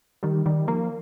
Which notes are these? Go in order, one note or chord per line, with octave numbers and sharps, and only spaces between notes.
D#3 G3
D#3 G3
F3 A#3